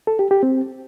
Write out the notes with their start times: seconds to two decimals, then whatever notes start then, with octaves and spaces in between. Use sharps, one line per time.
0.07 A4
0.19 G4
0.31 G4
0.43 C4